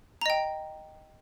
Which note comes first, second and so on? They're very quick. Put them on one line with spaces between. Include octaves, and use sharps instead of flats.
A#5 D#5 G5